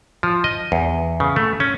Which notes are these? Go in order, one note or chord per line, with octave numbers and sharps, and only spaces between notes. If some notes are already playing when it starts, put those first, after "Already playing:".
F3
D#5
E2
C#3
A3
C#4